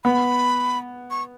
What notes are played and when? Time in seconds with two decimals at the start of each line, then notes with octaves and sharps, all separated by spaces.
0.04 B3 B5
1.11 C#6